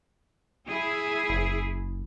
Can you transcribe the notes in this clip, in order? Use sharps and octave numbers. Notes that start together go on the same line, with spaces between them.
E4 G#4
F#1